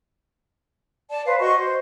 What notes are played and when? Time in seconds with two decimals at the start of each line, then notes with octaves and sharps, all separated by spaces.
1.10 D5 A5
1.25 B4 C5 F5
1.40 F#4 C5 D#5 C#6
1.57 C5